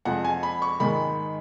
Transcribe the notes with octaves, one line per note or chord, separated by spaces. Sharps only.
F2 F3 G#3 F#5
G#5
B5
C#6
G#2 D#3 G#3 B5